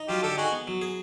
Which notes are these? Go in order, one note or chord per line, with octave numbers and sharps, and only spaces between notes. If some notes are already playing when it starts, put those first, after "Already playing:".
Already playing: D#4
F#3 F4 G4
D3 G4 A4
D#4 F#4 G#4
B3
F#3
G#4